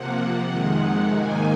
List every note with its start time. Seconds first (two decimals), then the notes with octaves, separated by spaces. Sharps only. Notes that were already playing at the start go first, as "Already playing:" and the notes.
Already playing: C3 F3 A#3 F#5
0.47 F2 C3 D#3 G#3
0.79 F#5
1.11 G#2 D#3 A#3 D#4 G#5